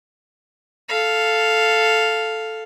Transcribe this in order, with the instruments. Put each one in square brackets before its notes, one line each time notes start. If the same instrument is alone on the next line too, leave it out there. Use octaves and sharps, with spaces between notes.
[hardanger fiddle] A4 F5